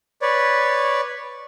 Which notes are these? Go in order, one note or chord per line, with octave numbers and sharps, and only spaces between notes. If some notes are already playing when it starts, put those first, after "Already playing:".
B4 C#5 D5